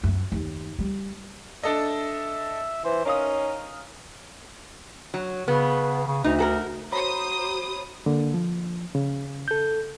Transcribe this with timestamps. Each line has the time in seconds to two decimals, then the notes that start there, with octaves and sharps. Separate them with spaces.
0.03 F#2
0.32 D#2
0.79 G3
1.63 D4 A4 D#5 E5
2.85 E3 C5
3.05 C#4 D#4 A#4 F5 D#6
5.14 F#3
5.48 C#3 B3
6.08 C#3
6.24 D2 D#4
6.38 F#4 A4 A#4
6.92 F#4 C5 C#5 A#5 B5 D#6
8.06 D3 A#3
8.34 F3
8.95 C#3
9.48 A4 G6